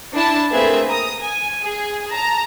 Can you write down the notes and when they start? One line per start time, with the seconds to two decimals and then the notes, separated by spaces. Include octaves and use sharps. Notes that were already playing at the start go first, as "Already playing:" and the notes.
0.13 D4 E4 A5
0.51 A3 A#3 C4 G#4 B4 E5
0.89 A#5 D#6
1.21 G#5
1.62 G#4
2.10 A5 A#5